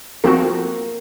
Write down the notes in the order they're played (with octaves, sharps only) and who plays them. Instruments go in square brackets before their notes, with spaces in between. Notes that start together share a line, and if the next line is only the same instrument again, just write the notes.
[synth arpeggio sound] F3 C4 F#4 [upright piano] A#3